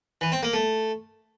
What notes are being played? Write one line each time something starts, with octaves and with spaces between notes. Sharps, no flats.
E3
C4
A#3
A3